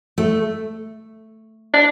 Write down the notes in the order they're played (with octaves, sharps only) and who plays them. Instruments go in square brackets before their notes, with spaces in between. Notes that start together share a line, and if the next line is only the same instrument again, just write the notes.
[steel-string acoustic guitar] A3
[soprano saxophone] D4